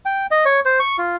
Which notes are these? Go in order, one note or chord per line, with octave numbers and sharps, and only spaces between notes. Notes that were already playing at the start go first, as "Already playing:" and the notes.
G5
D#5
C#5
C5
C#6
F4